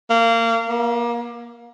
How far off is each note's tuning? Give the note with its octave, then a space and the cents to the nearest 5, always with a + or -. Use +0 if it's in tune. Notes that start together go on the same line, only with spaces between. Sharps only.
A#3 -25
A#3 +30